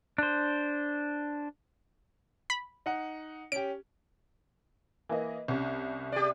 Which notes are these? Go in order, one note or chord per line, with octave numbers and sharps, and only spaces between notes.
D4 C5
B5
D#4 F#5
C#4 G4 D7
E3 A#3 D#5
C2 C#4
G4 D5